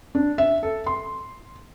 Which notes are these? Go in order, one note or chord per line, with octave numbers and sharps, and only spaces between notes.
D4
E5
A4
C6